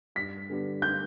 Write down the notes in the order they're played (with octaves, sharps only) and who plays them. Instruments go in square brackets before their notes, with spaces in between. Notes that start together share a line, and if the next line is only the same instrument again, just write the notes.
[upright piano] G2 [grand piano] B6
[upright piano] D3 G3 B3 D4
[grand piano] G6